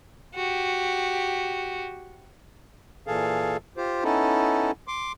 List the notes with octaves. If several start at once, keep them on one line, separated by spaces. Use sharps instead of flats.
F#4 G4
A#2 E3 G#4 A4 F5
F4 G4 C5
B3 C#4 D#4 E4 A4
C6 D6